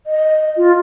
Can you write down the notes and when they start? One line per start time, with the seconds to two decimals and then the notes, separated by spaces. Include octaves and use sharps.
0.07 D#5
0.57 F4